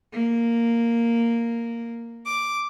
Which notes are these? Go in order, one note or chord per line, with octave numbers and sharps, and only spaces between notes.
A#3
D6